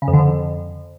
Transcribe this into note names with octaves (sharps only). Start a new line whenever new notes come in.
C#3
F2
D3
F2